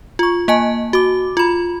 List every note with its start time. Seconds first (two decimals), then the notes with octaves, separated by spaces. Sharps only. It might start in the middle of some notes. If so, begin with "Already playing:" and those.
0.19 F4 C#6
0.48 A#3 D#5 G#5 A5
0.93 F#4 D6
1.37 F4 B5